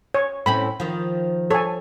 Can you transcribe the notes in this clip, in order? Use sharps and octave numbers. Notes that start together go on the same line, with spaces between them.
C#5
A2 C4 C#4 B5
D#3 F3
A4 C#5 G#5